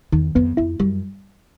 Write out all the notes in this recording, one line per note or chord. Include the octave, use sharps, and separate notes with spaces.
E2 D#3
F2 B3
F2 E4
F#2 G3